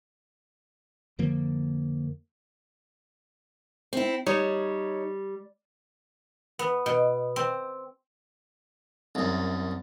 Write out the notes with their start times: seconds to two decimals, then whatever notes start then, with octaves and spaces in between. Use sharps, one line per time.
1.19 F2 D3 F3 A#3
3.93 C4 E4
4.26 G3 D#4 C#5
6.59 B3
6.86 B2
7.36 C4
9.15 C2 F#2